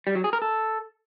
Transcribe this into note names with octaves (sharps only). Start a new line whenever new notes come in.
G3
F#3
G#4
A#4
A4